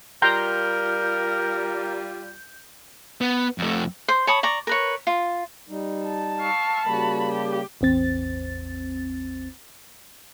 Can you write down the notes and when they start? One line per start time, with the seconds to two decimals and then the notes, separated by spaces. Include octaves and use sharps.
0.22 G3 F4 A#4 G5 A#5 C6 G6
3.21 B3
3.58 F2 A3
4.08 C5
4.27 C#5 A5 B5 D#6
4.43 D5 A#5 C#6
4.67 A#4 B4 C#5
5.07 F4
5.69 G3 D#4
6.05 A5
6.40 F5 C#6 E6
6.85 C#3 G3 A#3 F#4 B5
7.31 G4
7.81 A1 E2 C4 A6